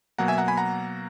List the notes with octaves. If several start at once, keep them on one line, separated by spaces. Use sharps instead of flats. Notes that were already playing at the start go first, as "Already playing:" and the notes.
B2 F#3 A#3 F#5 A#5
E5 G#5
F#5 A#5
G#5 B5
F#5 A#5